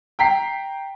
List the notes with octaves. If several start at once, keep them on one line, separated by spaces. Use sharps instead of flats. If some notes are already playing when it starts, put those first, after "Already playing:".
G5 A#5 B6 C7